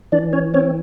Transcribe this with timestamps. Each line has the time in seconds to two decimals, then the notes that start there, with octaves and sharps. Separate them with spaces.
0.12 E3 D4 D5
0.33 C#4 C#5
0.54 C4 C#4 C#5